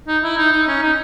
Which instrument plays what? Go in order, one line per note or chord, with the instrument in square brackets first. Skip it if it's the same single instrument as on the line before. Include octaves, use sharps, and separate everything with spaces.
[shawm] D#4
E4
D#4
D#4
C#4
D#4